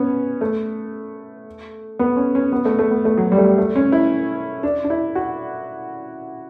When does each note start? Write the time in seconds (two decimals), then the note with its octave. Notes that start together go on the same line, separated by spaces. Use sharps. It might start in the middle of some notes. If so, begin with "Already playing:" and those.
Already playing: B3 C#4
0.41 A3
1.99 B3
2.16 C#4
2.35 C#4
2.52 B3
2.65 A3
2.79 A3
2.91 B3
3.05 A3
3.17 F#3
3.32 G3
3.38 A3
3.45 G3
3.58 A3
3.75 C#4
3.92 E4
4.63 D4
4.84 D4
4.90 E4
5.15 F#4